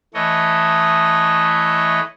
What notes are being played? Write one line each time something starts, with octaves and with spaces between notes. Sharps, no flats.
E3 A3 C#5 D#5